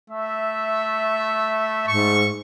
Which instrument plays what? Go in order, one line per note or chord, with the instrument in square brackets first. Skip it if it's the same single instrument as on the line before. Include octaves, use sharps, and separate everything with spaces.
[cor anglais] A3 [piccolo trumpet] E5
[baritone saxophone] G#2 [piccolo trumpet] C#6